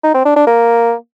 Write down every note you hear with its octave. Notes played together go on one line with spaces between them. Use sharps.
D#4
C4
D4
D4
A#3